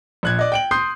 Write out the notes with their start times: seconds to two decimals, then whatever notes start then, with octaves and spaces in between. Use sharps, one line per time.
0.23 A#1 F#6 G#6
0.39 D5 D#5
0.52 G5 D7 F#7
0.71 C6 D#6 G6 C7